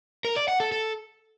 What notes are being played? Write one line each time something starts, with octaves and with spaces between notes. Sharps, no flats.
A#4
D5
F#5
A4
A4